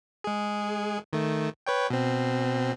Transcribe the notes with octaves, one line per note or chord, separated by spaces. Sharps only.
G#3 G#4
D#3 A3
B4 C#5 G5
B2 C4